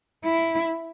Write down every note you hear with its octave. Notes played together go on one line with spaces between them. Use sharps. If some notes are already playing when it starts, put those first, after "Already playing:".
E4